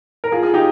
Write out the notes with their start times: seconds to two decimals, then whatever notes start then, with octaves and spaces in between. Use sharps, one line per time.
0.24 A#4
0.32 F4 G#4
0.43 F4 G#4
0.54 D#4 G4